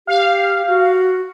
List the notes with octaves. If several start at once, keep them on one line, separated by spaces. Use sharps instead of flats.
G4 F5
F#4